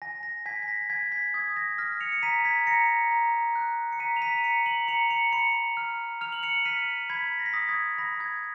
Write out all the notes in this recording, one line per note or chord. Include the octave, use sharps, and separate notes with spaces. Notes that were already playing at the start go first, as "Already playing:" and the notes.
G#5 A#6
A#6
G#5 G#6 B6
B6
A#6
G#5 G#6 B6
G#6 B6
D#6 G#6
A#6
F6 A#6
C#7 F7
C#7
A#5 B6 D#7
G#6 B6
A#5 A#6 C#7
A#5
F#6
C#7
A#5 B6 D#7
F7
B6 D#7
A#5 C#7 F7
D#7 F#7
A#5 C#7 F7
C#7 F7
B5 C#7 F7
F6
F6 F7
F#7
C#7 F7
F6 B6 D#7
B5 G#6 B6
A#6
B6
D#6 A#6
G#6
B5 A#6
G#6